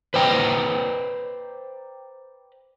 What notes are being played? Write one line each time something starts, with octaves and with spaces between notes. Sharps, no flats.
B4 C5 D5 G5 A#5